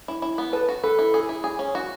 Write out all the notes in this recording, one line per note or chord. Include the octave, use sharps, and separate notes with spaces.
E4
E4
B3
A4 B4
F#4
A4 B4
E4
G#4
E4
G#4
C#4
F#4